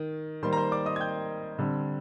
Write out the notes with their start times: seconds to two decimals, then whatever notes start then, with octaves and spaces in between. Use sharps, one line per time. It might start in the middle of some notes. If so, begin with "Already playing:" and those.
Already playing: D#3
0.43 D#3 G3 A#3 C5 C6
0.53 A#5
0.57 C5 C6
0.72 D5 D6
0.86 D#5 D#6
0.96 G#6
1.00 G5 G6
1.59 D3 G3 C4